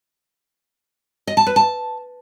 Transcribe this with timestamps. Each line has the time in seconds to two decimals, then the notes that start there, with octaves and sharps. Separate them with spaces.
1.27 D#5
1.37 A5
1.47 B4
1.56 A5